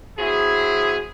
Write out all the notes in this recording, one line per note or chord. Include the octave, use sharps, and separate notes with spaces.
F#3 C4 E4 G#4